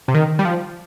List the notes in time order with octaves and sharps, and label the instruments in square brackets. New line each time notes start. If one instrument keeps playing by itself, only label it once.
[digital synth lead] C3
D#3
G3
F3